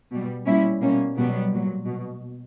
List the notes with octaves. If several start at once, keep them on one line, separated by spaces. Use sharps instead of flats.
B2 G3
A#2 G3 C#4 E4
B2 G3 A#3 C#4
B2 F#3 G3 B3
A#2 F#3
B2